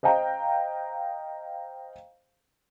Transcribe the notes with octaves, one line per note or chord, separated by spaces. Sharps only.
C5 D#5 F5 G5 A#5